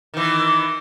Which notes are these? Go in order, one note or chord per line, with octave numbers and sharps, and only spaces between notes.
D#3 E3